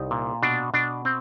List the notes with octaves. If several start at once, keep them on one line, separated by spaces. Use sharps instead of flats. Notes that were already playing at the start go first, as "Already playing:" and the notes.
Already playing: C2 D#4
A#2
B2 D4
B2 D4
C4